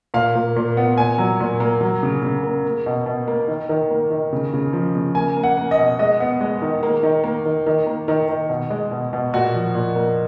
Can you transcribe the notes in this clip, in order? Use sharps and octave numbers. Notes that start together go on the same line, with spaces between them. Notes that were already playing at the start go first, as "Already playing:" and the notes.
A#2 F5
A#2
A#2
B3
A#2 G#5
F#3
A#2
A#3
F#3
C#3
C#3
A#3
A#3
B2
B2
A#3
D#3
D#3
A#3
D#3
C#3
C#3
F3
C#3
A#3 G#5
A#3
F#5
A#3
D#5
B2
G#3 D#5
B3
G#3
D#3
A#3
D#3
A#3
D#3
D#3
A#3
D#3
D#3
B2
G#3
B2
B2
A#2 F#4
F3
A#2
A#3